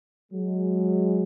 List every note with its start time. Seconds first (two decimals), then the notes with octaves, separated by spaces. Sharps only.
0.32 F#3 G#3